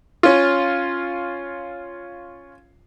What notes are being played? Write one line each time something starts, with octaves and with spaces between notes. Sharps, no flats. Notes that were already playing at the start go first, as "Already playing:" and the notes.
C#4 F4